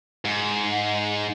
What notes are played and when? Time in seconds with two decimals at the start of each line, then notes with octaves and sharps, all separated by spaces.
0.25 G#2